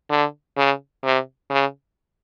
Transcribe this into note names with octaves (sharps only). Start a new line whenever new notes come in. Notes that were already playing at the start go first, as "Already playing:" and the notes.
D3
C#3
C3
C#3